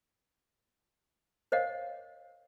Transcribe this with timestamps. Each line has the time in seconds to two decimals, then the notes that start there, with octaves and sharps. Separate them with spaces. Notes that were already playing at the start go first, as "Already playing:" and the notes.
1.52 A#4 C5 C#5 D#5 F5 F#5